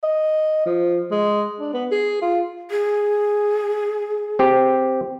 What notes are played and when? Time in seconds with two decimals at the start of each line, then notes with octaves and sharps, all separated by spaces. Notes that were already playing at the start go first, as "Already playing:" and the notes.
0.03 D#5
0.66 F3
1.11 G#3
1.60 D4
1.73 B3
1.91 G#4
2.22 F4
2.71 G#4
4.39 C4 G4